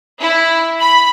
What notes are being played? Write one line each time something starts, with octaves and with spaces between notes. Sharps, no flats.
E4
B5